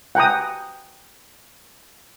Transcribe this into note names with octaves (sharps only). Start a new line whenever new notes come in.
F#5 G5 A#5 D#6